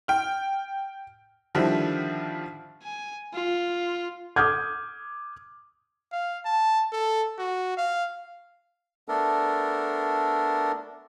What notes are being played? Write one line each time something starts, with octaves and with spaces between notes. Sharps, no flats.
G5 F6
D3 D#3 F3 G3 E4
G#5
F4
D6 D#6 F6 G6 G#6
F5
A5
A4
F#4
F5
A3 B3 D4 A4 A#4